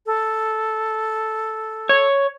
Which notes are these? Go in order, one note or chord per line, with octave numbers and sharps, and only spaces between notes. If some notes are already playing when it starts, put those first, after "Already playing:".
A4
C#5